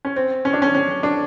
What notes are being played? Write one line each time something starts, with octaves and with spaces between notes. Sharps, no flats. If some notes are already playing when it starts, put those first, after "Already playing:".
C#4
C4
C#4
D4
C#4
C#4
D4